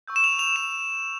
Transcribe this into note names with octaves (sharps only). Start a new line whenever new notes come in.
C#6 E6 G6
E7
F7
F7
E7